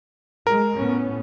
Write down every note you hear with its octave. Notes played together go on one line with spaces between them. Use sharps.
G#3 A#4
A2 B3 C#4